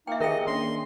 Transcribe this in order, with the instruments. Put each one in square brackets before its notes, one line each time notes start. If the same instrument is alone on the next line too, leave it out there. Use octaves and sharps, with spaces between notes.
[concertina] A#3 [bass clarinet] D#4 [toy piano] E5 G5
[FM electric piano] D#3 G4 A#5 [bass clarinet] G#4 [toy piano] A#4 G5 [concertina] D#5
[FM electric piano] A#3 C#4 D4 [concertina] C6